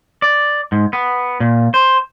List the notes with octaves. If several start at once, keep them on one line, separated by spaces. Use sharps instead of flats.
D5
G#2
B3
A#2
C5